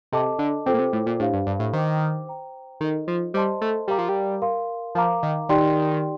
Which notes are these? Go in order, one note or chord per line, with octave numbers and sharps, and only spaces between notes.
C3 A4 D#5 A5 D6
D3
C3 F4 A4 C5 G5 D6
A#2
C3
A2
A#2
A2 D4 G4 C5 F5
G2
G2
A2
D#3 C5 G5 D6
C5 G5 A#5
D#3 D#4 A4 D#5
F3
G3 C5 D#5 A5 C6
A3
G3 G4 A#4 F5 A#5 D6
F3
G3
A#4 F5 C6
F3 A#4 F5 A#5 D6
D#3
D#3 D#4 G4 D5 G5 C6